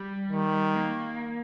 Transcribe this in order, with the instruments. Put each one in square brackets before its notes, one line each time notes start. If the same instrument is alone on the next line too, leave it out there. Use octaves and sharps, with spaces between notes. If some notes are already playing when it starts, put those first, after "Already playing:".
Already playing: [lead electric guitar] G3
[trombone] D#3
[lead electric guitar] A#3